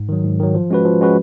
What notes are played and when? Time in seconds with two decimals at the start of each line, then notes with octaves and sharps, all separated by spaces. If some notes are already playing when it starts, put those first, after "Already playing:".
Already playing: G#2
0.09 D#3 F#3
0.25 G#2
0.40 D#3 F#3
0.55 F3
0.70 G#3 C#4 F#4 B4
0.85 F3
1.01 G#3 C#4 F#4 B4